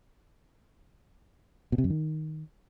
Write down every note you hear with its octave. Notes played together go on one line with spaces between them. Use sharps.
B2
C3
F#2
D#3